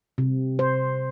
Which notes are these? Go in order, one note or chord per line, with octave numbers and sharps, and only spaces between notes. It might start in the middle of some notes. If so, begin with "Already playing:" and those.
C3
C5